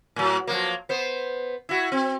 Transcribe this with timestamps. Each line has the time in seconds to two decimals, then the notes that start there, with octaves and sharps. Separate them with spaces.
0.16 A2 F#3
0.47 F3 F#3 A#3
0.89 B3 C5
1.69 E4 F#4
1.92 C4